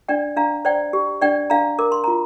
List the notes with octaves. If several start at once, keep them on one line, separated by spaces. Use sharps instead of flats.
D4 D5 G5
D4 F5 A#5
C5 D5 G5
G4
D4 D5 G5
D4 F5 A#5
A#4 D6
C6
F4 A#5